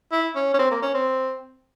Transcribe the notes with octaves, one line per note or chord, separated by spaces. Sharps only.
E4
C#4
C#4
C4
A#3
C#4
C4